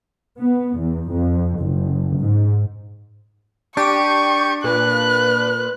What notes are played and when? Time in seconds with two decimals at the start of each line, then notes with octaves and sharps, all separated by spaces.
0.38 B3
0.76 E2
1.09 F2
1.60 F#1
2.18 G#2
3.77 D4 G4 C#6 D7 D#7
4.64 A#2 B4 F#6